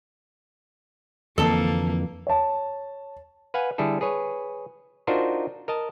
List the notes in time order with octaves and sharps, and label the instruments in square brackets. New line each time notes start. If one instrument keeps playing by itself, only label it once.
[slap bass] F2 D3 E3 [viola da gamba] A#3 [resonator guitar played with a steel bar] A4 A5
[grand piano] C#5 A5
[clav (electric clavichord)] B4 F5 F#5 G#5
D3 G3 E4 G#4 A4
G#4 B4 C#5
D4 D#4 F4 F#4 A#4 C5
A#4 D#5 A5